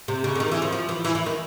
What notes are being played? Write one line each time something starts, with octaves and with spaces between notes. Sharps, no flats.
C3
C#3
D3
D#3
E3
F3
F3
E3
E3
E3
D#3